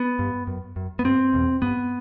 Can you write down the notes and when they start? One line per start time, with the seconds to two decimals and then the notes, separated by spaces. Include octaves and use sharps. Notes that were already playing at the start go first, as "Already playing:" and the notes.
Already playing: B3
0.19 G2
0.47 F#2
0.76 F#2
0.99 B3
1.04 G2 C4
1.33 E2 B2
1.62 G2 B3